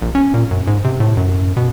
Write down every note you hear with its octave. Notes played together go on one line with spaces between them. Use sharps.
A#1
C#4
A#2
F#2
G#2
C3
A2
F#2
B2